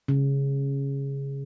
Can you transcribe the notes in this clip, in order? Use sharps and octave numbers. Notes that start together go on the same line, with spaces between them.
C#3